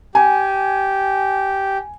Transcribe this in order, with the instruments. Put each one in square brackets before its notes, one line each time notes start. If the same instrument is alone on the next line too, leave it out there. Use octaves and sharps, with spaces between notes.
[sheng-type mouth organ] G4 [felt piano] G#5